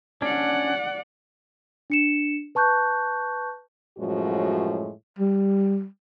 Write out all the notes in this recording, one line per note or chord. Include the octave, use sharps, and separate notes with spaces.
C#4 D4 D5 F#5
D4 C#7 E7
B4 A5 C#6 F#6 G6
F#2 A2 F3 G#3 F#4
G3